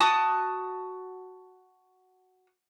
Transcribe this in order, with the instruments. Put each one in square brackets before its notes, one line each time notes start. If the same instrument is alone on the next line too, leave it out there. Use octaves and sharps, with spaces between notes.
[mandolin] F#4 A5 D#6